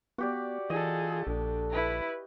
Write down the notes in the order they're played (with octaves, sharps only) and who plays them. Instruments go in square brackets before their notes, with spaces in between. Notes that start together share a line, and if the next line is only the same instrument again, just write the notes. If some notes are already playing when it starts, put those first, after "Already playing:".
[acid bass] B3 [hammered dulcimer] F#4 G4 D5
[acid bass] E3 [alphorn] F4 [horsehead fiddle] G#4 A4 [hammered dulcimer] D#5
[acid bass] A#1 [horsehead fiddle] D4 [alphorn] A4
[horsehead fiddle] E4 B4